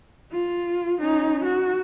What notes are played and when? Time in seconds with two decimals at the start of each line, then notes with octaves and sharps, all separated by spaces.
0.32 F4
1.00 C#4 D#4
1.44 F#4